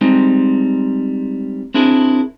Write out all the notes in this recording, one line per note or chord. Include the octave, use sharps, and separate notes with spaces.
G3 G#3 C4 D#4
C4 D4 E4 G#4 A#4